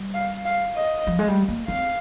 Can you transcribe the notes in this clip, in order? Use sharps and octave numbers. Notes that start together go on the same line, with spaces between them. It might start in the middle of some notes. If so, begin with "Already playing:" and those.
Already playing: G3
F5
F5
D#5
F3
G#3
G3
A#3
C4 F5